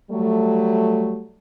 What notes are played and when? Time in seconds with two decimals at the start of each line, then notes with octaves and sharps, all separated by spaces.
0.11 F#3 G3 A3